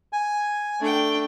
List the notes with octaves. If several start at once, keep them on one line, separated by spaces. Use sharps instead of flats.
G#5
A3 D4 G5